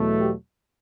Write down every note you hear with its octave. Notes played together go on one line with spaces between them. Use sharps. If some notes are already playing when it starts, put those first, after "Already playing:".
Already playing: E2 B2 F#3 A3
G4